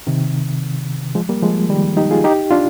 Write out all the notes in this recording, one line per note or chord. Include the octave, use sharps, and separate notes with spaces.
C3 D#3
F3 G#3
G3 A#3
F3 G#3
D#3 G3
D#4 G4
F4 G#4
D#4 G4
D4 F4